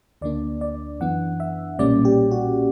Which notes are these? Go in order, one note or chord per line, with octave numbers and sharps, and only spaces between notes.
D2 D3 A#3 D4 D5
D5
F#2 E3 B3 D4 F#5
E5
B1 A#2 G3 A#3 C#4 D5
G4
F#4